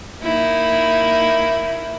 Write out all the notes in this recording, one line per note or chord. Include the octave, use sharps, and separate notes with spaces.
A#3 D#4 E4